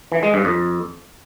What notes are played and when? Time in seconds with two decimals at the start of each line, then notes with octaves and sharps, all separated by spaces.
0.12 E3
0.23 G#3
0.34 G2
0.45 F2